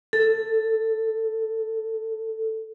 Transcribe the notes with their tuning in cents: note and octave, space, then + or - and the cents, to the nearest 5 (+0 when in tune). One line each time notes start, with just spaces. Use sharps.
A4 +10